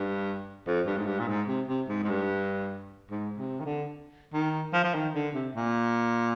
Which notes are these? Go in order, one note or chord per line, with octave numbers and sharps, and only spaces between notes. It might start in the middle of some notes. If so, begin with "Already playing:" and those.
Already playing: G2
F2
G2
G#2
G2
A#2
G#2
C3
C3
G#2
G#2
G2
G#2
C3
D#3
D3
D#3
F3
F3
D#3
D3
C3
A#2